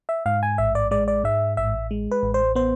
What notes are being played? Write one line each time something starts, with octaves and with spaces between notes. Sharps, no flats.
E5
G#2 F5
G#5
A1 E5
D5
G#3 D5
D5
G#2 E5
A1 E5
G#3
B4
A1
C5
B3 C5